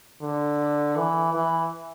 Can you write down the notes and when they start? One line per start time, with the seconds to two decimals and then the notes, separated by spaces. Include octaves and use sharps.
0.21 D3
0.96 E3
1.34 E3